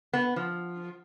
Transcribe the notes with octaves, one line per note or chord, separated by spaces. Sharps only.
B3
F3